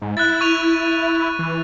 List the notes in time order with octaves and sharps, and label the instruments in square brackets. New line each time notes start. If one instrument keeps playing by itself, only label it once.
[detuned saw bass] G#2
[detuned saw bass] E4 [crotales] F#6 A6
[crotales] C#6 D#7 F7
[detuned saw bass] E3